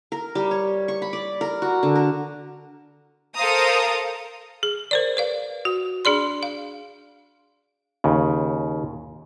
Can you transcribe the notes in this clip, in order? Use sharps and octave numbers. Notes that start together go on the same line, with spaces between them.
A#4
G3
C#5
C#6
B5
D5
A#4
F#4
D3
A#4
A4 A#4 C5 F5 A#5 D#6
G#4
A#4 C5 D5
B4 D5 F5
F#4
D4 G#4 D5 C6
F5
D#2 C#3